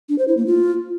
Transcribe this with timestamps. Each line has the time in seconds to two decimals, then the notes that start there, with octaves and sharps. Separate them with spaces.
0.09 D4
0.18 C5
0.28 E4
0.37 A#3
0.47 F4